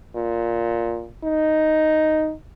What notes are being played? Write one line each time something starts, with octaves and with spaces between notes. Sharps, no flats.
A#2
D#4